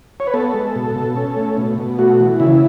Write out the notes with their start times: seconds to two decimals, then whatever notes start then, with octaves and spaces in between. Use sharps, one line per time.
0.20 C#5
0.27 B4
0.34 B3 A4
0.54 G#3
0.75 B2
0.95 B2
1.16 C#4
1.36 A3
1.57 B2
1.78 B2
1.98 A3 F#4
2.19 E3
2.40 C#3 E4